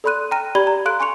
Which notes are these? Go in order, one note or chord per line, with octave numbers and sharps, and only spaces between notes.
A4 D5 B5 C6 F#6 D#7
G5 A#5 F6 A#6 D#7
G4 D5 B5 G#6 G7
A#5
A4 F5 C6 F#6 D7 D#7
G#5 C6 C#6 C#7 F7